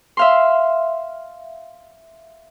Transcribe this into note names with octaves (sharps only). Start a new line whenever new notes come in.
E5 F5 C6